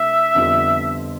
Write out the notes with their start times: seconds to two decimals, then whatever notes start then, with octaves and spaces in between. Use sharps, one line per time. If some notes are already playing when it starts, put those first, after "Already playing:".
Already playing: C3 A3 D4 E5
0.35 F2 D3 G3 B3 F4